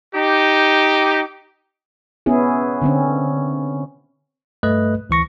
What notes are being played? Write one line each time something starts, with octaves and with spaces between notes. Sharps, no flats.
D#4 G4
B3 C#4 E4 G#4
D3 C4 C#4
G2 A3 B4 D#5 F#6
D2 E3 C#6 A#6